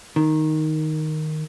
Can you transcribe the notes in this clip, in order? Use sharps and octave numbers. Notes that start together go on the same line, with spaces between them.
D#3